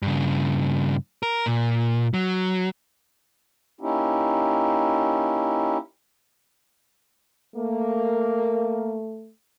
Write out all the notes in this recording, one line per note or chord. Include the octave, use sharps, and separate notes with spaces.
G2 C#3
A#4
A#2
F#3
A#3 C#4 D#4 E4 G4
A3 A#3